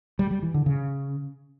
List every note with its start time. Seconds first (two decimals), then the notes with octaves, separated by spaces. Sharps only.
0.19 G3
0.31 G3
0.43 E3
0.54 D3
0.66 C#3